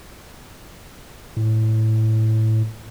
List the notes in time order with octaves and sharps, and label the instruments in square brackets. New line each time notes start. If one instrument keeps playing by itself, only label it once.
[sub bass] A2